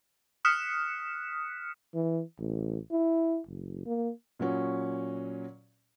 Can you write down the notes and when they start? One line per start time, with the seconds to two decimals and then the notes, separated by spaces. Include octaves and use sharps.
0.45 D#6 F6 F#6 B6 C#7 E7
1.94 E3
2.39 A1
2.92 E4
3.47 F#1
3.86 A#3
4.39 A#2 F#3 C#4